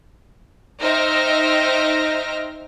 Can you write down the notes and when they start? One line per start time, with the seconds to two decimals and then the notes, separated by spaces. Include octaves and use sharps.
0.79 D#4 C5 E5 G5 F6 A#6